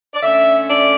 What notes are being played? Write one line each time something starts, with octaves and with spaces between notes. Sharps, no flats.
D5
D3 A3 C#4 E5
D5